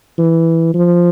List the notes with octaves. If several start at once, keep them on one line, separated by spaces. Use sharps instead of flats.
E3
F3